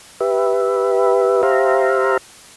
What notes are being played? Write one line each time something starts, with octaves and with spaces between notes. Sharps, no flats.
G4 B4 E5
G4 C5 E5 F5 A#5